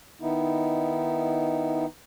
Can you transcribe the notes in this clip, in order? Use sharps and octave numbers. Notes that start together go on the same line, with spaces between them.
D#3 B3 D#4 E4